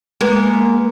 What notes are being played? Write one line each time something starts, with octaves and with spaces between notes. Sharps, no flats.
G#3 A#3 B3